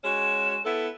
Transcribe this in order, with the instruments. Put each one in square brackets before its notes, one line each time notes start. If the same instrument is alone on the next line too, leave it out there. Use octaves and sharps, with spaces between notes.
[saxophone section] G#3 C#4 F#4 [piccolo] E7
[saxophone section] B3 E4 A4